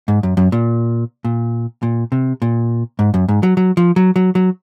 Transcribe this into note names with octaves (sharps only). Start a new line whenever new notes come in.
G#2
F#2
F#2
A#2
A#2
A#2
C3
A#2
G#2
F#2
G#2
F#3
F#3
F3
F#3
F#3
F#3